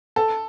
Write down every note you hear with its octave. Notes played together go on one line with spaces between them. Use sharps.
A4